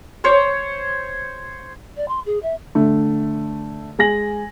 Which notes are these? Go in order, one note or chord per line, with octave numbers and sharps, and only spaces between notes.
C5 C#5
D5
C6
G#4
E5
D3 A3
G#3 G#5 A#6 F#7